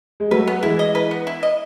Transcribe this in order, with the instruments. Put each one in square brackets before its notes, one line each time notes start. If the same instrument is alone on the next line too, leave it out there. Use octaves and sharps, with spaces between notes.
[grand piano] G#3
[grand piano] F#3 A3 [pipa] B4
[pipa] B3
[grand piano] E3 G#3 [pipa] E4
[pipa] D#5
B4
B3
E4
D#5